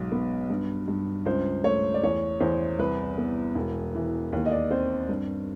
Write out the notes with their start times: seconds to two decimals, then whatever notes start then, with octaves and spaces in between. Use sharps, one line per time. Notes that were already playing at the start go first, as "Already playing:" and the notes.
Already playing: B1 G#2
0.12 B3
0.50 G2
0.88 G2
1.26 C#2 C5
1.64 A3 C#5
1.94 D5
2.03 E2 C#5
2.40 E2 C5
2.79 C2 B4
3.18 B3
3.55 E1
3.95 E3
4.33 D#2
4.46 D#5
4.51 D5
4.70 C4 C5
5.09 G2